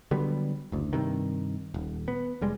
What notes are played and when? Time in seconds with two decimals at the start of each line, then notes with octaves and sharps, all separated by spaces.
0.11 D3 F#3 G3 B3
0.72 F#1 D2
0.93 G2 C3 D#3
1.74 D#1
2.08 B3
2.41 F1 G3 G#3